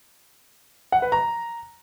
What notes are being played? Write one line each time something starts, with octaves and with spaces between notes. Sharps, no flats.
F#5
B4
A#5